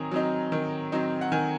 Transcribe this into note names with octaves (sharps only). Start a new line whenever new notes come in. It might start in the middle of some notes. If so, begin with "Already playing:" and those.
Already playing: D#3 F#3 C4 G#5 A#5 D#6
F#3 C4 D#4
D#3
F#3 C4 D#4
F#5
D#3 G#5